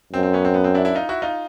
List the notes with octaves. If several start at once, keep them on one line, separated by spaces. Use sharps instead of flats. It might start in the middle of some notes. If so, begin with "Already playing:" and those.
F#2 C4
C4
B3 C#4
C4
B3
C4
D4 E4
D4 E4
D#4 F4
E4 F#4
D#4 F4